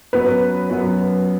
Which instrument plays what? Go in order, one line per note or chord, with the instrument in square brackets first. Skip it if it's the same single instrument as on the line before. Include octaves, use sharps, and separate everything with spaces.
[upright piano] F#2 F#3 B3 [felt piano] B4
[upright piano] F#2 F#3 B3